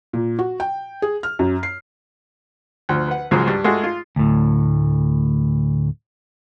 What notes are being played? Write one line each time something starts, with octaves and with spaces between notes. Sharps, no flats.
A#2
F#4
G5
G#4
F6
F#2
C7
D2 F3
B4 F#5
C#2 G#2 F3 F#3 G#3
G2
G#3 A3 F4 F#4 G#4
F4
D2 A2